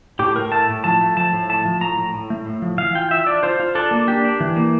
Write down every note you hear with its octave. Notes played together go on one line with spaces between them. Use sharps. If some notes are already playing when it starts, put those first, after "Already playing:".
A2 G4
A2 A#4
A3 A5
A2
F3 A5
A3
F3 A5
A2
A3 A5
F3
A2 A#5
A2
A2
A3
A2
F3
E3 F5
F4 G5
F4 E5
D4 D5
F4 C5
F4
D4 A4
A#3
D4 G4
D4
E3
A#3